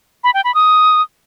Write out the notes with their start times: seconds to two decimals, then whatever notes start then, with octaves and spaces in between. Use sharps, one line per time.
0.24 B5
0.34 G5
0.44 B5
0.55 D#6